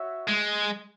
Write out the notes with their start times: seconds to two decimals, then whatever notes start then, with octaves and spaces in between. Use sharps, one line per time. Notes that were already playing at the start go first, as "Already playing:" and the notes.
Already playing: F#4 C#5 E5
0.28 G#3